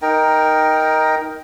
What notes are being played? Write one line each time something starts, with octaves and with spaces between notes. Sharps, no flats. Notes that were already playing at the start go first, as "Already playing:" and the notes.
D#4 A#4 G5